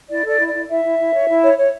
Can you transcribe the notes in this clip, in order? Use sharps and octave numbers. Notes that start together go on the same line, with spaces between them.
E4 D5
A4 D5
E4
D5
E4
E4 E5
E4
E4
C#5
E4
C#5
C#5